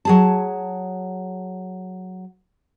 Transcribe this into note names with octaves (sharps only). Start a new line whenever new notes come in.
F#3 G#4 A5